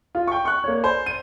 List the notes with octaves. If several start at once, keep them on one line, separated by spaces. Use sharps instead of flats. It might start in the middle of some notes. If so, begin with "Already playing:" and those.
F4
G5 C#6
C#6 F#6
A#3 C#5
C5
D#7